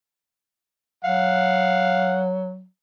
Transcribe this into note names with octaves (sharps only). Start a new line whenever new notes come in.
F#3 F5 F#5